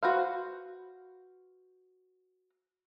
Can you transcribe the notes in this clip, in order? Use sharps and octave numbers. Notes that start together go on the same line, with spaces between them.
F#4 B4 C5 F5